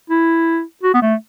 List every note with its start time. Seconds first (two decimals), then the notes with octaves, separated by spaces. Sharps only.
0.10 E4
0.83 F#4
0.94 B3
1.02 A3